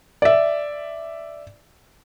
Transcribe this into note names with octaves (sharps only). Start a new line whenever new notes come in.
D5 E5